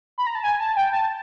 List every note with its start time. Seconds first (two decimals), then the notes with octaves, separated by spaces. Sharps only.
0.18 B5
0.27 A#5
0.35 A5
0.44 G#5
0.60 A5
0.77 G5
0.93 A5